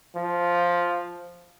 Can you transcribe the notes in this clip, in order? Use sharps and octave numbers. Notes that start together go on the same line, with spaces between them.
F3